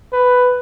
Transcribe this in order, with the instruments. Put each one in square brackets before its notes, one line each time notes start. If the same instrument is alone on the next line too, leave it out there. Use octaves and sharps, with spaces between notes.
[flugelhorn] B4